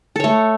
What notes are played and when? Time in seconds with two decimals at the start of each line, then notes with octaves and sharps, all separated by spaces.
0.16 A4
0.20 C#5
0.24 A3